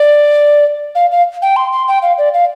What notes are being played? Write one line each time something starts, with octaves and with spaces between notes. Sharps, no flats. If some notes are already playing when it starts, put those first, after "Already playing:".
Already playing: D5
F5
F5
G5
C6
C6
G5
F5
D5
F5